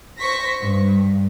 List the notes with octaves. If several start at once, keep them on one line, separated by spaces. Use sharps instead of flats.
C5 C#6 A#6 B6
G2